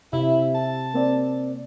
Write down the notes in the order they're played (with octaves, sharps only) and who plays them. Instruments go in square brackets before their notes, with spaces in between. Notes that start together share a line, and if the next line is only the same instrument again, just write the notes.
[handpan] C3 [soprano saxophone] E4 [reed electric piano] E5
[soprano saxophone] A5
[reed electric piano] A#3 C4 D5